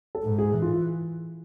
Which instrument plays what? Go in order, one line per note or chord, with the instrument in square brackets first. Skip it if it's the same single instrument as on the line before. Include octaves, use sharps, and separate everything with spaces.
[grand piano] A4
[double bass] G#2
[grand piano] G#4
[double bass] E3
[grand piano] F4